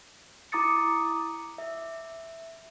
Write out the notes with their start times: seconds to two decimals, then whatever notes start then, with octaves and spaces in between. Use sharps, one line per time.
0.52 E4 A#5 D6 D#6 A6 C#7
1.58 E5